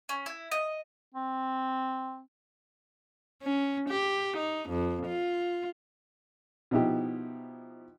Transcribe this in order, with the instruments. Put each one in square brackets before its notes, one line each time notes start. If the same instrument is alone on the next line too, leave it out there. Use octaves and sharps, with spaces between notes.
[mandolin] C#4
E4
D#5
[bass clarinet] C4
[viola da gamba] C#4
G4
D#4
F2
F4
[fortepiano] B2 F3 D#4 E4 G4